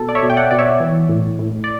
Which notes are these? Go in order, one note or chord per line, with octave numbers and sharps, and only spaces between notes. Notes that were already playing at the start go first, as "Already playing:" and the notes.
Already playing: B2 A4
D5
C#5 E5
B2
G5
D5 F#5
B2 D5
C#5 E5
E3
A2
A2
D5